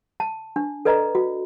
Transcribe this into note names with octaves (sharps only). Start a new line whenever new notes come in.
A5
D4
A4 B4 D5 D#5 A#5
F#4